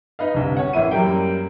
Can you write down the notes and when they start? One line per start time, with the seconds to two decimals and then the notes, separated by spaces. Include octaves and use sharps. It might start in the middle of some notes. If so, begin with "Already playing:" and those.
0.19 D#4 B4 D#5 F5
0.34 G1 C2
0.57 C#4 C#5 F#5
0.73 A1 A#3 E4 D#7
0.91 F#2 F#3 G3 A#3 G5